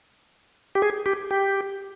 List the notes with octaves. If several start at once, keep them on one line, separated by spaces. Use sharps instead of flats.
G4
G#4
G4
G4